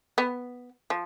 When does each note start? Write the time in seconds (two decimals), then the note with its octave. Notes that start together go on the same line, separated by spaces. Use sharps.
0.18 B3
0.90 F3